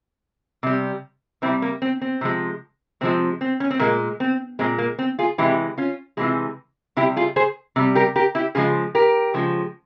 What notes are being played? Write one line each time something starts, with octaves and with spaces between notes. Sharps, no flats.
C3 G3
C3 G3 C4 E4
A#3
C4
C4
C3 F3 G#3
C3 F3 G#3 C4
C4
C#4
C4
A#2 G#3 A#3
C4
A#2 G#3 C4
A#3
C4
F4 G#4
C3 E3 G#3 E4 G4
C#4 F4
C3 E3 G#3 F4 G#4
C3 G3 E4 G4
F4 G#4
G#4 C5
C3 G3
G4 A#4
G4 A#4
E4 G4
C#3 F3 G#3 F4 G#4
G4 A#4
C#3 F3 G#3